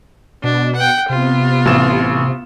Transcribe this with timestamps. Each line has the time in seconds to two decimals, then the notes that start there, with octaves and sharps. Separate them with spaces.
0.44 B2 D4
0.76 F#5 G5
1.09 C3 B3 F4
1.66 A1 E7